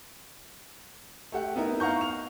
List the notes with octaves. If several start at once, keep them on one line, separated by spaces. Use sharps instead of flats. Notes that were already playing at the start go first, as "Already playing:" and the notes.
A3 G4 F#5
B3 D#4 E4 A#4
F5 F#5 A#5 C#6 G6
F7